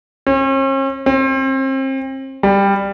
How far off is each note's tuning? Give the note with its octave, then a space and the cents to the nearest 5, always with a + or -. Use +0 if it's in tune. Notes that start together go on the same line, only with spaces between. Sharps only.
C#4 -45
C4 +35
G3 +15